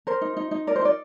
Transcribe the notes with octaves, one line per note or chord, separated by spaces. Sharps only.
A#4 C5
D#4
D#4
D#4
A#4 D5
C5
D#4 D5